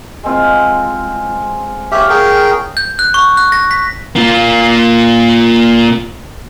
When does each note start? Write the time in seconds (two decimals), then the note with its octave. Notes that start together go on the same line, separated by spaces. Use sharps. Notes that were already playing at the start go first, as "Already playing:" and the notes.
0.23 G#3 C4 F4
1.92 G4 C#5 E5 F5
2.10 G#4 A#4 G5
2.77 G6
2.99 F#6
3.14 C#6
3.37 F#6
3.52 A#6
3.71 B6
4.16 A#3 F4